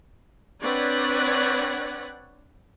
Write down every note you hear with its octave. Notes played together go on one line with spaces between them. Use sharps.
C4 D4 B4 C#5 D5 F#5